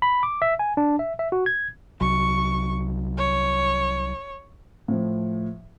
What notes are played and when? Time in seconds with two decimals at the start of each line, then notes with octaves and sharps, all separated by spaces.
0.02 B5
0.23 D6
0.42 E5
0.59 G#5
0.77 D4
0.99 E5
1.19 E5
1.32 F#4
1.46 G#6
2.01 C2 F#3 C#6
3.18 C#5
4.88 A2 F3